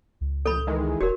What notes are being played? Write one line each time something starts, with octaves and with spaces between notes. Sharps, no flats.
C#2
A#1 A4 B5 G6
D#3 E3 G#3
D#1 F#4 A#4 C#5